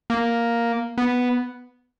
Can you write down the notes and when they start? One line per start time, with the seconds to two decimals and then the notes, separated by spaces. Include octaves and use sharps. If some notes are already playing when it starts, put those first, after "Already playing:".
0.10 A#3
0.98 B3